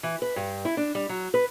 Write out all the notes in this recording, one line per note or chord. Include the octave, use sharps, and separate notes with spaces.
E3
B4
G2
E4
D4
G3
F#3
B4